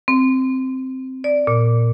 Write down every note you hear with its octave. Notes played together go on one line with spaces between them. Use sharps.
C4
D5
A#2